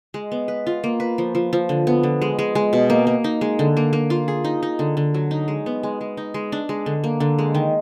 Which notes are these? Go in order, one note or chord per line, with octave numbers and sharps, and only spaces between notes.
G#3
B3
B4
F4
A#3
B4
F3
F3
F3
D3
B3
D3
G#3
G#3
G#3
B2
A#3
A#3
D#4
G#3
D3
A#3
A#3
F4
G#4
D#4
D#4
D3
D3
F#3
D#4
G#3
B3
G#3
G#3
D#4
G#3
D4
G#3
D3
A#3
D3
G#3
D#3